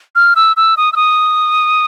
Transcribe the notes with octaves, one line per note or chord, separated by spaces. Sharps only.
F6
E6
E6
D#6
E6
D#6